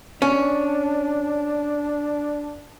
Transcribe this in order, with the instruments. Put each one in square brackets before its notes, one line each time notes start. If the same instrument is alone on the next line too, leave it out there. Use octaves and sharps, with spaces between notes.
[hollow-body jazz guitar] C#4 [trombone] D4